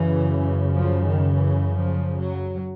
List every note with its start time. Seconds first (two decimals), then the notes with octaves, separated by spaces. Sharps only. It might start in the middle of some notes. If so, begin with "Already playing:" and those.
Already playing: F#2 C#3 E3
0.75 F3
1.04 D#3
1.32 E3
1.75 F3
2.18 F#3